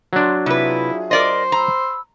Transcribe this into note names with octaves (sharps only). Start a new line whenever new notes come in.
F#3 D4 C6
C3 E4 F4 G#4 B4 E5
A#4 C5 D5 D#5
A#5 B5 E6